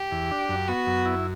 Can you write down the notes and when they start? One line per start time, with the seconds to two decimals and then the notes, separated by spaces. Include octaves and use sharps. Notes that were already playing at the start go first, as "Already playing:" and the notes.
Already playing: G4
0.12 E2
0.31 D4
0.49 F#2
0.68 B3 F#4
0.87 F#2
1.05 E4